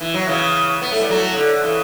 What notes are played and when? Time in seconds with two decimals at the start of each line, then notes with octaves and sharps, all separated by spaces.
0.01 E3
0.14 F#3
0.27 C#3 E3
0.82 B3
0.92 A3
1.00 G3 B3
1.10 F#3 A3
1.33 C#3
1.37 D3
1.63 C#3 E3